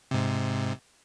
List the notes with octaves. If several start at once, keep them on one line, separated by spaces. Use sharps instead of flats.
G#2 C3